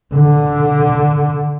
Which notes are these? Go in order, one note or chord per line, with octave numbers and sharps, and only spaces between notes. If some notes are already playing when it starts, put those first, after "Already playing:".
D3